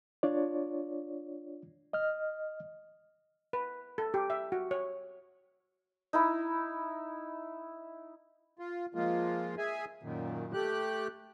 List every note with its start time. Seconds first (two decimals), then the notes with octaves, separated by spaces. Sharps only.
0.23 D4 F4 C#5 D5
1.93 D#5 F6
3.53 B4
3.98 A4
4.14 G4
4.30 E5
4.52 F#4
4.71 C#5
6.13 D#4 E4 B5
8.59 F4
8.95 F3 G#3 A#3 F4
9.58 G#4 E5 G#5
10.03 F#2 A#2 D#3
10.53 A3 G4 F#6